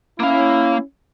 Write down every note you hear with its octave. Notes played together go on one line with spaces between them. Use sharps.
A#3 C#4 E4 F5